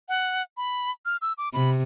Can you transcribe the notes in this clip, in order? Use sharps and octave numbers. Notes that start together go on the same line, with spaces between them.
F#5
B5
F6
E6
D6
C3 B5